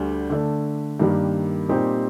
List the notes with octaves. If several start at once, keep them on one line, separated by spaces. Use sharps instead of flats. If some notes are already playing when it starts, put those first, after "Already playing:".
Already playing: D2 D3 G3 D4
D3 A3 D4
G2 D#3 G3 A#3
A#2 G3 C4 D#4 G4